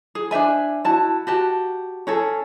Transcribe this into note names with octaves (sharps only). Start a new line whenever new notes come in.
G#4
D4 C5 E5 G#5
E4 F#4 A5
F#4 G4 A5
C#4 G#4 A4